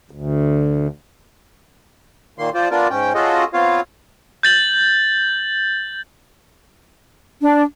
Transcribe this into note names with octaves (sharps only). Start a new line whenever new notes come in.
D2
A#2 D#3 A#3 C6
F3 F4 C5 D5
B3 D4 F4 A#4 D5
G#2 C#4 G5
C#4 F4 F#4 G#4 A4 D#5
B3 C4 F4 C#5 F5
G6 A6 F#7
D4